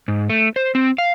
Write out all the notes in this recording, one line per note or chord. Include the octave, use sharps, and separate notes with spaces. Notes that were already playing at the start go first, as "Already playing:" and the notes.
G#2
A3
C5
C4
F5